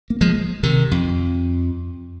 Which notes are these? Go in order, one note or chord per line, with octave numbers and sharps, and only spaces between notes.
A#3
F3 G#3
C3 D#3
F2